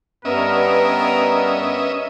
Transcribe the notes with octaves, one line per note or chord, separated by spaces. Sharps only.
G2 B3 C#4 A#4 D#5 E5